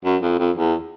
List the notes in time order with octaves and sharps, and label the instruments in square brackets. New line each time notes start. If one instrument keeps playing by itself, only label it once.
[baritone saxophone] F#2
F2
F2
E2